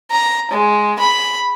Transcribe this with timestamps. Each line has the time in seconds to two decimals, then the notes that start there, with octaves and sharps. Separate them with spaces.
0.11 A#5
0.51 G#3
0.99 B5